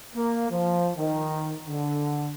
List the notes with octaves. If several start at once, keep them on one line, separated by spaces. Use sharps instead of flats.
A#3
F3
D#3
D3